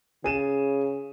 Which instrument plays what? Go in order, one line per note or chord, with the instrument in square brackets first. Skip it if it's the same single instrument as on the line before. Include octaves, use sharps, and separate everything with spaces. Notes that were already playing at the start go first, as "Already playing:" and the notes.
[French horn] C#3 [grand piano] G#4 D#7 E7